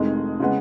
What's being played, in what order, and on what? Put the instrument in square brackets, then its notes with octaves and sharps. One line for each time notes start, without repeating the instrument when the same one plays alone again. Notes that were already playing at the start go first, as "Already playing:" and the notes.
Already playing: [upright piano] F1 F2 D#3 G#3
C#3 G#3 B3